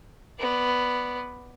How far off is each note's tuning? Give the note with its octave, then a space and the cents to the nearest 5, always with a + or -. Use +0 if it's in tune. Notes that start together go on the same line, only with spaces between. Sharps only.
B3 +0 D5 +0